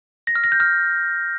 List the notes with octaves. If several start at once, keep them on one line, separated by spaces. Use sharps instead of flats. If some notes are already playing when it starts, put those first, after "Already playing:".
A#6
F6
A#6
G6
F6